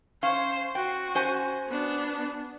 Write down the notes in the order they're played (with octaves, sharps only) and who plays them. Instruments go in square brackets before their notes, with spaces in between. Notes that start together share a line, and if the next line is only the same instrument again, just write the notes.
[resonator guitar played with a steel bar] C#4 F5 [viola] C5
[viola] F#4 [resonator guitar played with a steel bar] G5
[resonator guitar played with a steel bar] C#4 C5 G#5
[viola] B3 D4